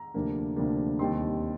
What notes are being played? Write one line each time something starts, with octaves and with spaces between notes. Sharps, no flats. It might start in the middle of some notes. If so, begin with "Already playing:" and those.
Already playing: A#5
D2 C3 F3 A#3 D4
D2 C3 F3 A#3 D4
D#2 D#3 G3 C4 D#4 C6